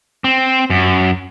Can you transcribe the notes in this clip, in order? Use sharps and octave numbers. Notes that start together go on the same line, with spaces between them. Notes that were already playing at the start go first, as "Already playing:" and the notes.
C4
F#2